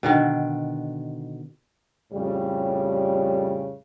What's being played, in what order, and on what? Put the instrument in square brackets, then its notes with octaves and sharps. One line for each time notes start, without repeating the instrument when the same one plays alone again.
[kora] B2 D3 D#3
[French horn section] F2 A2 C#3 G3